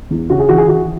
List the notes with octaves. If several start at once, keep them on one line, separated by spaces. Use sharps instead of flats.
E2
C#3 F#4
G#4
E3 F#4
G#4
E3 F#4